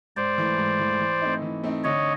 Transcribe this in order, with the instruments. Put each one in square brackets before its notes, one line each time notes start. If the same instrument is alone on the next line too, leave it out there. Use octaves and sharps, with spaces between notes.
[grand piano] G#2 [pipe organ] C5 D5
[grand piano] E3 A3
G#2
E3 A3
E3
A3 C4 D#4
E3
A3 C4 D#4
[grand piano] D3 [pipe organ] C#5 D#5